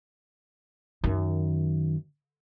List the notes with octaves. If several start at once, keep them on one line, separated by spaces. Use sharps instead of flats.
F#2 D#3